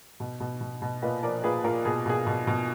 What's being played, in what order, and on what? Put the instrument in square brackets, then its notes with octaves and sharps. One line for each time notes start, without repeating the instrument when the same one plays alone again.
[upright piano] B2
B2
B2
B2
A#2 B4 D#5
F3 A#4 D5
A#2 G#4 B4
A#2 A#4
B2 G#4
B2 G#4
B2
B2